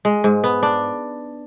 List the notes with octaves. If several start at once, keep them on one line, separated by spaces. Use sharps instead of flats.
G#3
G#2
B3
D4